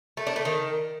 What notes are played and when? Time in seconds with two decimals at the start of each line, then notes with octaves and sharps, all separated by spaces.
0.17 A3
0.27 D4
0.36 A3
0.45 D#3